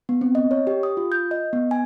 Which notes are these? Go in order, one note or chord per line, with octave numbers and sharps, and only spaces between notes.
B3
C4
D#5
C#5
G4
D#6
F4
G6
D#5
B3
G#5